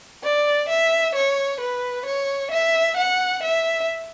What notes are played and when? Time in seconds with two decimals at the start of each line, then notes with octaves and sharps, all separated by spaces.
0.23 D5
0.69 E5
1.15 C#5
1.60 B4
2.06 C#5
2.51 E5
2.97 F#5
3.43 E5